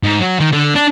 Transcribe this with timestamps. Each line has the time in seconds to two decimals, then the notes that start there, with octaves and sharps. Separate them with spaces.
0.03 G#2
0.20 F#3
0.39 D#3
0.52 D3
0.75 D4